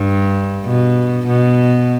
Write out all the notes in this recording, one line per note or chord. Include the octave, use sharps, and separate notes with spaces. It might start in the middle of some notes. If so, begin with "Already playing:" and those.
Already playing: G2
B2
B2